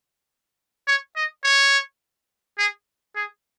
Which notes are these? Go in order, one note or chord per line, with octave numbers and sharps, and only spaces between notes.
C#5
D#5
C#5
G#4
G#4